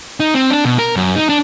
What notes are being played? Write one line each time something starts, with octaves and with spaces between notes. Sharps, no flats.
D#4
C4
D4
B2
A#4
F#2
D#4
D4